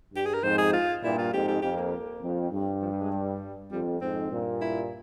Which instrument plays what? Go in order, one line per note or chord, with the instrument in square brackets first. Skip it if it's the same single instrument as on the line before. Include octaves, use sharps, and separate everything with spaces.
[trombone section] G2 [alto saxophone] G4
[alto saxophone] G#4
A#4
[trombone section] F2 G#2 [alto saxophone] C5
[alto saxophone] G#4
F4
[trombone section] G2 A#2 [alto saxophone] E4
[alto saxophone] F4
[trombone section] F2 G#2 [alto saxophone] G4
[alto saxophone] G4
[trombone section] F2 [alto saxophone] G4
[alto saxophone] A#3
[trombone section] F2
G2
[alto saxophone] F3
G3
G#3
G3
[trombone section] F2 [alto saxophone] G3
[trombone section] F2 G#2 [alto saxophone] C4
[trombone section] G2 A#2
[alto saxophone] E4